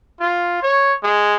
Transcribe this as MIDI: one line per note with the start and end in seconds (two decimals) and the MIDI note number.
0.20 0.59 65
0.63 0.93 73
1.03 1.37 56